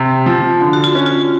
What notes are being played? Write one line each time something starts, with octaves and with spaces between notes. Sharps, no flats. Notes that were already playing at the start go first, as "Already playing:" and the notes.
Already playing: C3
F3
D3
F#4
F4
C#4
F4